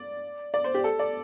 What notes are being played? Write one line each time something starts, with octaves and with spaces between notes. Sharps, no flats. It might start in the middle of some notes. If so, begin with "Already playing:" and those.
Already playing: D5
D5
C5
G4
A4
D5